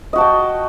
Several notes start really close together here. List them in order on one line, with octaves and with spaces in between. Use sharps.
D#5 F#4 A5 G5